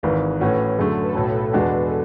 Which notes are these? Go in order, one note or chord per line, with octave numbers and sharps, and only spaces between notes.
G#1 G#2 E3 B4
A2 E3 A3 C#4 F#4
F#2 D3 A3 G#4
A4
B4
B1 A2 F#3 A4
E2 B2 G#3 D4 F#4